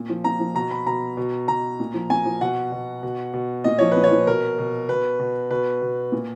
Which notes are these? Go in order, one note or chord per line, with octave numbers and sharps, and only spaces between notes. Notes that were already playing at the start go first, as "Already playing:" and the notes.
Already playing: A#2
F3
A#2 A#5
F3
B2 A#5
B5
B2 A#5
B2
B2 A#5
A#2
F3
A#2 G#5
F3
B2 F#5
B2
B2
B2
A#2 D#5
F3 C#5
A#2 B4
C#5
F3
B2 A#4
B2
B2 B4
B2
B2 B4
B2
A#2